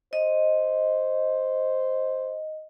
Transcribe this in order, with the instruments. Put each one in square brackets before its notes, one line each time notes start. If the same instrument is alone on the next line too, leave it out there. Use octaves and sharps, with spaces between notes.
[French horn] C5 [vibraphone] D#5